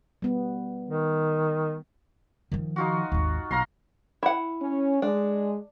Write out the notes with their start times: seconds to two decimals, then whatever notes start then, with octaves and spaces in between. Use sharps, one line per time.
0.22 G3 B3
0.89 D#3
2.52 D#3 F3
2.76 D#4 F4 F#4
3.12 G#1 D#2
3.51 B1 F5 A#5 C6
4.23 E4 F#5
4.62 C#4
5.02 G#3 D4